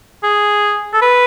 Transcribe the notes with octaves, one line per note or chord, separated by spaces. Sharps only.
G#4
A4
B4